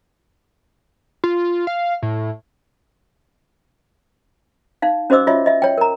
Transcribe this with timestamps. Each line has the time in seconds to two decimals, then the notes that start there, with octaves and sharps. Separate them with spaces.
1.24 F4
1.67 F5
2.02 A2
4.82 D#4 F5
5.10 C#4 F#4 C5 D#5 D6 E6
5.27 F4 F#4 C#5 D#5 E5
5.46 D#5 E5
5.62 C#5 G5
5.78 A#4 A#5